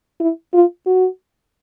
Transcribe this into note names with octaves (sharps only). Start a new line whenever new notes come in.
E4
F4
F#4